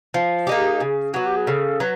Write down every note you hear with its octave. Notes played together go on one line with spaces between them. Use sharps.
F3
A#3 D#4 G4 G#4
C#3
F#3 B3 F#4
G4
G#4
C#3 A4
F#3 B4